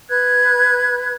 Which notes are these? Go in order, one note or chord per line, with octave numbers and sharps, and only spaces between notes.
B4 F#6 G#6